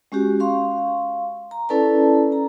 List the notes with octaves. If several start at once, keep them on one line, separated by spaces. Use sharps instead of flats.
G#3 C#4 F#4 G4
F5 C6 C#6
A#5
C#4 E4 A4 B4 D5 A5
A#5